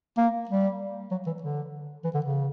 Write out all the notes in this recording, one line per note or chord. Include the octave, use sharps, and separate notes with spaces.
A#3
G3
F#3
E3
D3
E3
D3
C#3